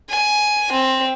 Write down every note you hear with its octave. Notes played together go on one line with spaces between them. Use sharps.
G#5
C4